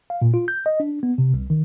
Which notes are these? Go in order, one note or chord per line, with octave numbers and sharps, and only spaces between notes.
F5
A#2
F4
G6
D#5
D4
B3
C3
C2
D#3